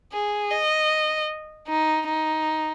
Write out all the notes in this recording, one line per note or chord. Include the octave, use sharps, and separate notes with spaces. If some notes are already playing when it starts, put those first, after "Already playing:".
G#4
D#5
D#4
D#4